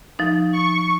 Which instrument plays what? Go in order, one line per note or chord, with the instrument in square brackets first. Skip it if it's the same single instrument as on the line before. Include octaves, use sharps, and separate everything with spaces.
[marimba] F3 D#4
[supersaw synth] C#6